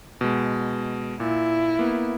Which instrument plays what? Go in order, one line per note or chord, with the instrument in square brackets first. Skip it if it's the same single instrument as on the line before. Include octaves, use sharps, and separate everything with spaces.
[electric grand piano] B2 G#3
[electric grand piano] A#2 [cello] E4
[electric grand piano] A#3 B3